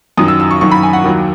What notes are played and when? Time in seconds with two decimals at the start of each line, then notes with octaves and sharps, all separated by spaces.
0.18 F#2 D#3 F#3 D#6
0.28 E6
0.40 E6
0.51 C#6
0.61 F#2 D#3 F#3 C#6
0.71 B5
0.83 G#5
0.93 F#5
1.04 D#2 D#3 F#3